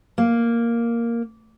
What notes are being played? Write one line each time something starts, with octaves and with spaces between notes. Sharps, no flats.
A#3